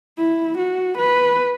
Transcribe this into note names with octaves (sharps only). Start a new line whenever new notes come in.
E4
F#4
B4